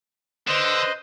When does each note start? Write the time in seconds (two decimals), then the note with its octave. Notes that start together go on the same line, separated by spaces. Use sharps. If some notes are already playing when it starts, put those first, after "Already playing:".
0.47 D3 B4 C5 D#5